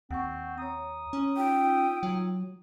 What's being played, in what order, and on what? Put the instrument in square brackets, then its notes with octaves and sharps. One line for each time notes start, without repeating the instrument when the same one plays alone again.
[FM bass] D#2 [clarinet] C4 [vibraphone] F#5 C#6
[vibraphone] C#5 A#5 [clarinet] D#6
[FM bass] C#4
[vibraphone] D#4 F4 E6 [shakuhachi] G5
[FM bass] F#3